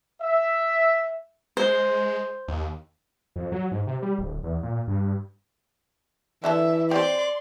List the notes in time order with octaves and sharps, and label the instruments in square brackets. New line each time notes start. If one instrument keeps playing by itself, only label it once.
[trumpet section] E5
[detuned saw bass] G#3 [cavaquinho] C5
[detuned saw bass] D#2
F2
F#3
G#2
C3
G3
D1
E2
A#2
G2
[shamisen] D3 E4 A4 [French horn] E3 [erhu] E5
[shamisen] C4 G4 [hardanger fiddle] D5 [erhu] C6